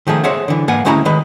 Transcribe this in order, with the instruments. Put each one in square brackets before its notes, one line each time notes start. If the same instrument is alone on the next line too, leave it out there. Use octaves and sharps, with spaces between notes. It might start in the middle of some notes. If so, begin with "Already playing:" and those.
[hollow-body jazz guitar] D#3 F3 A3 G#4
G#4 C5 C#5 E5 F#5 G#5
D3 E3
G#2 A#3 B4 F5 F#5 G#5
D2 G#3 C#4 E4 A#5 B5
D#3 G#3 B4